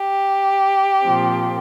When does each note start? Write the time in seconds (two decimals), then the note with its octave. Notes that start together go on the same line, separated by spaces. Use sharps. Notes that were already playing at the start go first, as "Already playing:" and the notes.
Already playing: G4
1.02 A#2 F3 C4